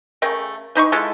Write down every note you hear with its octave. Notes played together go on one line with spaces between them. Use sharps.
C#3 A3 A#4 G5
E3 D#4 B5 C#6
G#3 E4 F4 A4